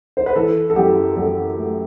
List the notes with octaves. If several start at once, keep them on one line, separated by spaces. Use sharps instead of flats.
C5
B4
E3 A4
A4
F#2 G4
F#2 A4
A3